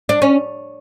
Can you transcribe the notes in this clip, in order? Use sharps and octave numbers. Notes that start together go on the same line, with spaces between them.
D4
C#4